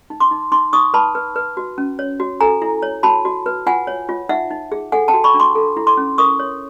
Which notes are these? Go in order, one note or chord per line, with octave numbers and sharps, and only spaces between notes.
D#4
C6 D6
D#4
D#4 C6 D6
D#4 C#6 D#6
B4 A5 B5
B4
B4
F#4
C#4
C#5
F#4
A4 G#5 A#5
E4
C#5
F#4 A5 B5
F#4
B4
F4 F#5 G#5
C#5
F4
D#4 E5 F#5
D#4
G#4
A4 F#5 G#5
G5 A5
F#4
B5 C#6
D4
C6 D6
A4
E4
C6 D6
C#4
A#4 C#6 D#6
C#5